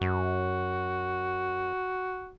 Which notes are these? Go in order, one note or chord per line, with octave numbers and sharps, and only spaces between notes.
F#2 F#4